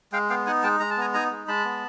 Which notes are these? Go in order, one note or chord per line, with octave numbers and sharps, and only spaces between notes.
G#3 F5 G5
B3 F5 G5
D#4 F#5 G#5
G#3 G5 A5
G#3 A#5
A5
B3 G#5 A#5
D#4 G#5 A#5
G#3
G#3 A5 B5
B3